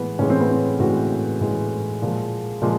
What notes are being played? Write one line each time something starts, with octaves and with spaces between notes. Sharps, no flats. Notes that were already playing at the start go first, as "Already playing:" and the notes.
Already playing: A2 E3 G#3 B3
A2 E3 G#3 C#4
C4
B3
C4
A2 E3 G#3 F#4
A2 E3 G#3
A#2 F3 G#3
A#2 F3 G#3